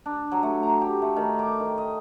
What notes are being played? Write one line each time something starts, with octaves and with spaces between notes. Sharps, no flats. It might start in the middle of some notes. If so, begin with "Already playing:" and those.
D4
F#3
A3
A#5
G4
A3
D#3
D6
D#3
D#5